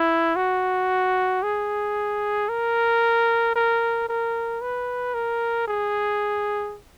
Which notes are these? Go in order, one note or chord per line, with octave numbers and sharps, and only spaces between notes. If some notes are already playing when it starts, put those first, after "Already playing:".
Already playing: E4
F#4
G#4
A#4
A#4
A#4
B4
A#4
G#4